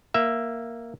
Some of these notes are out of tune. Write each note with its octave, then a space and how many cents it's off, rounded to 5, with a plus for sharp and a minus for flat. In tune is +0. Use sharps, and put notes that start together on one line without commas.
A#3 +0 E5 +10